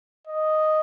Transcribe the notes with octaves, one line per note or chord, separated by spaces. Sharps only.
D#5